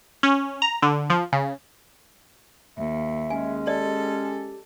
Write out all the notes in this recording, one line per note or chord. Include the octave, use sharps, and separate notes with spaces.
C#4
A#5
D3
F3
C#3
D#2 E5
G#3 C#4 G#5
G4 A4 D5 D#5